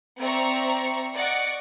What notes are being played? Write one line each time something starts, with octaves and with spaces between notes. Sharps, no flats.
C4 D5 E5 A#5 C#6
D5 D#5 F#5 C#6 C#7 D7